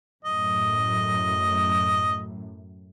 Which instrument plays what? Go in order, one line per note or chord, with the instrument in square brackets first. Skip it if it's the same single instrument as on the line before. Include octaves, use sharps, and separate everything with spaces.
[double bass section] F#2 A2 [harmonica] D#5